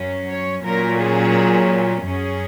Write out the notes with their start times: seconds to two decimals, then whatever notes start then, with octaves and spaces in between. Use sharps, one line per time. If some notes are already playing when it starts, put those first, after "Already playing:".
Already playing: F#2 F#3 C#4
0.29 C#5
0.64 A#2 F#3 C#4 A#4
0.99 G#4
2.06 F#2 F#3 C#4 G#4